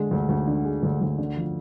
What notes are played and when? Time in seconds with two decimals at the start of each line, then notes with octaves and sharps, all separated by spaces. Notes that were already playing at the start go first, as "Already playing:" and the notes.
Already playing: D3 G#3
0.11 D2
0.29 D2
0.47 D3
0.65 G#3
0.83 D2
1.01 D2
1.18 D3
1.36 F3